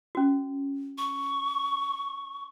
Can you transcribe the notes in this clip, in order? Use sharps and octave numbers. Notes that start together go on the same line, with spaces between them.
C#4 F#4
C#6